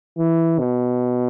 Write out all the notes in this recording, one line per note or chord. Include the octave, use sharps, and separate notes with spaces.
E3
B2